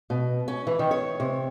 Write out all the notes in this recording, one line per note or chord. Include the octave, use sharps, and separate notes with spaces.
B2
C#4
E3
D#3
C#5
C3